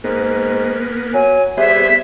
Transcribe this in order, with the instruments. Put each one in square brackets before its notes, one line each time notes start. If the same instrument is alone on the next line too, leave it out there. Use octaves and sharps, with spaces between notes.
[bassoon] G#2 [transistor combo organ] A#3 B3
[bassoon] F#3 [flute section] G#5
[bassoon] G3 [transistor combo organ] B3 G#4 C5 [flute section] E5